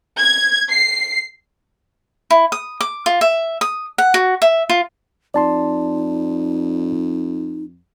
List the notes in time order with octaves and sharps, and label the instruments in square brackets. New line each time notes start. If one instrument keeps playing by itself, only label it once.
[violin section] G#6
C7
[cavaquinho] E4
D#6
D6
F4
E5
D#6
F#5
F#4
E5
F4
[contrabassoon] F2 [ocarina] D#4 [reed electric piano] D5 A5 C6